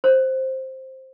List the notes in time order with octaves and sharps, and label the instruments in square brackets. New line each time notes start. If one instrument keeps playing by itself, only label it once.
[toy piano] C5